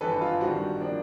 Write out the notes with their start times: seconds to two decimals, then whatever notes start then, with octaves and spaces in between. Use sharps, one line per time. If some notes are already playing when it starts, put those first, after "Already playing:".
0.01 G#1 G2 E3 A4 B4
0.21 F4
0.41 G2 D#3 G3 C4 F#4
0.81 F3 A#3 D4